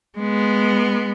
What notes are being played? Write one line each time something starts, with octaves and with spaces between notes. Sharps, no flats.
G#3 B3